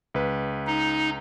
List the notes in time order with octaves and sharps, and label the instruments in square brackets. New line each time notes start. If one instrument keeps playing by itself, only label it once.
[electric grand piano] C#2 B4
[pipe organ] D#4